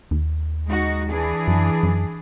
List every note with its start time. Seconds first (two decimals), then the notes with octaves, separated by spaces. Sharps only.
0.11 D#2
0.68 G#3 D#4 F#4
1.09 E3 D4 G#4
1.48 F#2
1.83 F#2